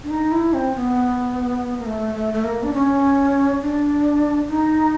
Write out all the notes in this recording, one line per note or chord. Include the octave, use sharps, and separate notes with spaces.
D4
D#4
E4
C4
B3
A#3
A3
A3
A3
A#3
D4
C#4
D4
D#4